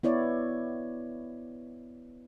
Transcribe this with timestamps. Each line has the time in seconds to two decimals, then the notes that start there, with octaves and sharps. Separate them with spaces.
0.03 B3 E4 C#5 D5